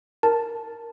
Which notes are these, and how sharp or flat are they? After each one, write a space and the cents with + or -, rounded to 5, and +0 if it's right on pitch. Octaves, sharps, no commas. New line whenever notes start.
A#4 +0 A5 +0